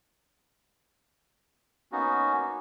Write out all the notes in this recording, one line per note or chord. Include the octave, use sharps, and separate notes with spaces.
A#3 B3 C#4 D#4 F#4